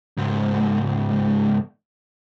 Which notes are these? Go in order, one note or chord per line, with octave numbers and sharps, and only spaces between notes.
C#2 G#2